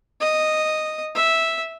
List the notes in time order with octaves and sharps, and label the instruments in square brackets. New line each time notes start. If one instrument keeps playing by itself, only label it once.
[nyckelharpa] D#5
E5